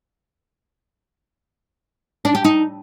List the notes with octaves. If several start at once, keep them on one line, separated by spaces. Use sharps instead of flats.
D4
G4
D#4